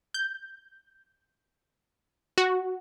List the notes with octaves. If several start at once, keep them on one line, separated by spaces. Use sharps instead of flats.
G6
F#4